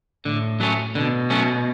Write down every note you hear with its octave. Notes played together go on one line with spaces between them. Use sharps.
A2 D3
F#3 A3 C#4
B2 D3
F#3 A3 C#4